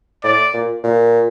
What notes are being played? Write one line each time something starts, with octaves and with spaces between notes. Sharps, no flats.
A2 D5
A#2
A#2